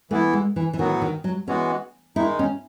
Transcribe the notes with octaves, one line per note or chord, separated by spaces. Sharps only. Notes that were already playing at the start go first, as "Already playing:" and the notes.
E3 A3 B3 E4
G#3
E3
E3
A2 D#3 F#3 B3 F#4
D#3
F#3
E3 G#3 B3 C#4 F#4
D#3 G#3 D#4 E4
C#4